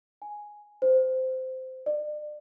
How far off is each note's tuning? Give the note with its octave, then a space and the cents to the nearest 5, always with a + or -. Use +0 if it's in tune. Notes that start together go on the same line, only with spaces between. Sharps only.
G#5 +5
C5 -15
D5 +35